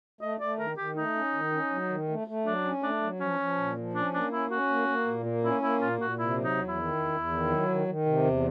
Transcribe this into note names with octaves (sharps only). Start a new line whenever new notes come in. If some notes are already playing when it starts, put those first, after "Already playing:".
A3 D#5
A3 D5
D#3 A#4
D#3 G4
A3 D#4
C#4
D#3
C#4
F#3
D#3
A3
A3
F#3 D4
C#4
A3 D4
F#3
F3 C#4
F3
A#2
F3
C#4 D4
A#3 D4
C#4 E4
C#4 F#4
A#3
A#3
A#2
A#3
C#4 E4
A#3 E4
A#2 F4
A#2 F#4
C3 E4
F#3
D#4
E2
E4
D#3
E2
E2
D#3
F#3
D#3
D#3
C3
E2